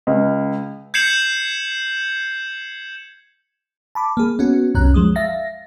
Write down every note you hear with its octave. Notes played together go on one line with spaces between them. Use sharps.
C#2
G6 G#6 C7 C#7 E7 F#7
A5 B5 D6
A#3 G#4
B3 C#4 F#4
C2 F#2 C#4 A#5 F#6
F3 G#3 D#6
E5 F5 A6 A#6